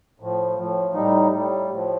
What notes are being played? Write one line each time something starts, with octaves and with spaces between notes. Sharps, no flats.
A2 F3
A2 F3
A2 G3 D#4
A2 G3
A2 F3